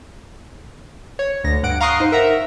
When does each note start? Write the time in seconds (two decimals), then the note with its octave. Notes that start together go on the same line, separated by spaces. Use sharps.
1.19 C#5
1.44 D2 A#6
1.63 G2 F#5 D7
1.81 F5 A#5 C6 C#6 D#6 F#6
2.00 D#4 C5
2.12 A#4 E5 F#5 A#5